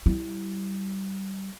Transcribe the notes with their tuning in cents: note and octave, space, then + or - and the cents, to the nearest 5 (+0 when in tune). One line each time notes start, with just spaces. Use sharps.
G3 -20 E4 +0